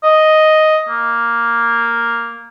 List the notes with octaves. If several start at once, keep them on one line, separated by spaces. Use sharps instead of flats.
D#5
A#3